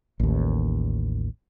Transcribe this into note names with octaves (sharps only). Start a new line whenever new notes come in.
A1 D#2